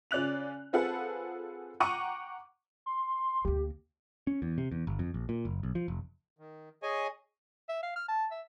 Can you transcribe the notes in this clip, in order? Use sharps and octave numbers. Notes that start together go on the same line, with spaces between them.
C#3 C#4 D5 F#6 F7
C4 F4 G#4 A4 B4 F#5
F#5 G5 A#5 C#6 D6 D#7
C6
D2 A#3 G4
C#4
E2
C3
E2
G1
F2
A#1
A#2
F#1
B1
F3
F1
D#3
G#4 C#5 D#5 G#5
E5
F5
F6
A5
E5